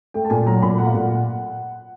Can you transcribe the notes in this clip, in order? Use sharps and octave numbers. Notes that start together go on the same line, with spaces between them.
A3 G5
A5
A#2 G#5
F#3 A#5
A#2 B5
A3 F#5
F5
A#2 F#5